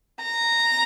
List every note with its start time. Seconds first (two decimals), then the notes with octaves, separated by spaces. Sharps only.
0.25 A#5